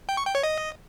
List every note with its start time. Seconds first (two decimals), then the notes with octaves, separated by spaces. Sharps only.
0.09 G5
0.17 C#6
0.26 G5
0.35 C#5
0.43 D#5